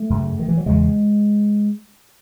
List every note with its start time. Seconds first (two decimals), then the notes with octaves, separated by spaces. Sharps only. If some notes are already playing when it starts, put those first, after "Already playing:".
Already playing: A3
0.10 F#2 C#3
0.39 D#3
0.48 E3
0.57 F#3
0.66 E2 C#3 G#3